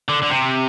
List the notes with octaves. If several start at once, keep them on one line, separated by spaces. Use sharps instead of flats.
D3
D3
C3